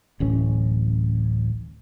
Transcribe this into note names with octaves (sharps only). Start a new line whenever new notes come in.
D1 A1 C#4